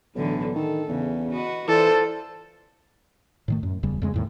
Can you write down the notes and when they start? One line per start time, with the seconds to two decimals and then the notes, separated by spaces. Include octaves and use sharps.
0.15 B1 A2 D3 E3
0.56 D#3 A4
0.88 E2 C#3
1.31 F#4 B4 D#5
1.68 E3 F4 A4 C5 D5
3.48 A2 D#3 A3
3.63 F#2
3.83 D1 E2 C#3 G3
4.02 F2 C#3 G#3
4.14 E2 A2 D#3